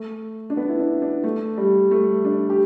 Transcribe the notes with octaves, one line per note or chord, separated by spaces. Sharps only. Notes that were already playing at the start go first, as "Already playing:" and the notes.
Already playing: A3
D4
B3
E4
D4
D4
A3
G3
A3
D4
G4